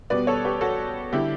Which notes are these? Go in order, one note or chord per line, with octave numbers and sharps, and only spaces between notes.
B2 G3 B3 B4 D5
A4 C#5
G4 B4
F#4 A4
D3 G3 E4 G4